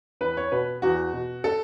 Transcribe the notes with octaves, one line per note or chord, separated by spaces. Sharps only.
E2 B4
C#5
B2 B4
E2 F#4
B2
A4